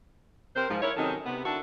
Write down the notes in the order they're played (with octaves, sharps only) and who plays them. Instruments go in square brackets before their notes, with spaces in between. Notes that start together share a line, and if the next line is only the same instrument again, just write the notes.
[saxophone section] C3 C4 A#4 C5
G#2 F3
D#4 E4 A#4 C#5
C3 D#3 F#3 C#4 D#4 A4
C3 B3
D#3 D4 E4 F#4 A4